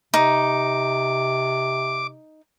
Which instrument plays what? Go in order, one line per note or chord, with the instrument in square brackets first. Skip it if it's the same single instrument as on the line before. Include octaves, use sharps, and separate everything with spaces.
[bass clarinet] C3 [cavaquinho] D#4 [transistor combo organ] D6